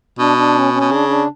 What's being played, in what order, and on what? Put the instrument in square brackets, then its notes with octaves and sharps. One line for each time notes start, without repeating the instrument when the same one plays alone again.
[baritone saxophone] B2 [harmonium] D4
[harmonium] D4
C#4
C#4
[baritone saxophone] B2
[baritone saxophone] C#3 [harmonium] D4
[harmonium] D4